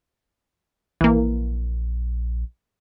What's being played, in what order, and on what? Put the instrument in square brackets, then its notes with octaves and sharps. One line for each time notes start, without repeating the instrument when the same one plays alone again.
[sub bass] A#1 [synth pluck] E3 A#3